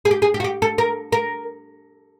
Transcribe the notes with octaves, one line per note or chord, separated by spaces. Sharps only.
G#4
G4
G#4
G4
F#4
G4
A4
A#4
A#4